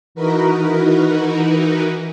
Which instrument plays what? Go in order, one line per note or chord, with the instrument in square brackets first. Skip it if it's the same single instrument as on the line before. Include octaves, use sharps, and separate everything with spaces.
[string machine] E3 D#4 F#4 A#4 B4